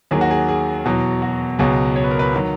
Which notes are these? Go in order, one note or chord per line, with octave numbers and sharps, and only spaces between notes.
D#2 D#3 F#3 G#4
F#4
G#4
G#4
E2 B2 F#3
F#4
C#2 B2 F#3 G#4
C#5
B4
A#4
B4
D#3 F#3